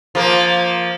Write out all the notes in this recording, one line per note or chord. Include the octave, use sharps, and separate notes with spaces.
F3 A#3